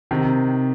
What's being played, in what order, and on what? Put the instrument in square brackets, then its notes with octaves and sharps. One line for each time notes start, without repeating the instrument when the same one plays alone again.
[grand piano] C3 D#3